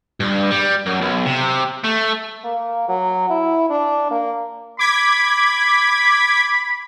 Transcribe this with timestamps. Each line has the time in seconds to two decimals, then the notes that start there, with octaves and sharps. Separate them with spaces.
0.20 G2
0.51 G3
0.86 F#2
1.02 B1
1.26 C3
1.84 A3
2.44 A#3
2.89 F#3
3.30 E4
3.70 D4
4.11 A#3
4.79 B5 D6 G#6 B6